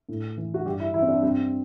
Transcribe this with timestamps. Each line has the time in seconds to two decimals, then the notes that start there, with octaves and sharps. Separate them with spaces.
0.09 A2
0.37 E3
0.54 F#4
0.65 G2 G4
0.80 E4
0.94 E3 E4
1.02 C4
1.08 D4
1.22 G2 C4